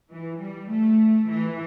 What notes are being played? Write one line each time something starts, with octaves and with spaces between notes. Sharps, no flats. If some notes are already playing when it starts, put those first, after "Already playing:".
E3
G3
A3
E3